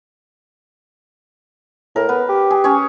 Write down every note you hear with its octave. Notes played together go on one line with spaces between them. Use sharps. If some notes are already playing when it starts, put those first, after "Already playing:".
A2 A#4
B3 B4
G4
G#4
C#4 G#4 C#5